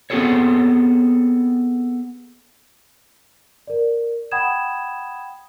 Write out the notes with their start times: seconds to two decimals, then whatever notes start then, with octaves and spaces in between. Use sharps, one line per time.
0.10 B3 C4 F4 G#4 A4 C#5
3.67 A#4 D5
4.31 F#5 G5 B5 D#6 G#6 E7